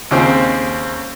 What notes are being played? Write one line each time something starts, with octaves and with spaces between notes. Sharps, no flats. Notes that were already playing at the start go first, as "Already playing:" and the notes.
D#2 C#3 C4